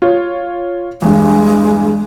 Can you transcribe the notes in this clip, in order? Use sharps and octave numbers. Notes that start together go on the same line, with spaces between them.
F4 C#5
E2 G2 G#3